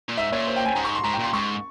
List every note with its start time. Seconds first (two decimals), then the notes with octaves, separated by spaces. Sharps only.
0.09 A#2
0.17 G#2 E5
0.32 A#2 C#5
0.47 C5
0.56 G5
0.65 G#5
0.75 G#2 A#5
0.85 C#6
0.95 C6
1.04 G#2 A#5
1.14 G5
1.19 A#2
1.24 C6
1.33 G#2 C#6